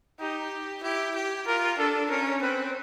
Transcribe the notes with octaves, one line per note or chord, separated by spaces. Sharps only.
D#4 G4
E4 G4
G4
F4 A#4
D4 A4
C#4 A#4
C4 B4